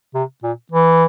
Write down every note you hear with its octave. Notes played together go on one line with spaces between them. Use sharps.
C3
A#2
E3